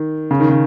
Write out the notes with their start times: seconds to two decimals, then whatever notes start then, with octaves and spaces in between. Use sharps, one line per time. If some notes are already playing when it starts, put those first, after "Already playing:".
Already playing: D#3
0.31 C#3
0.40 D#3
0.50 C#3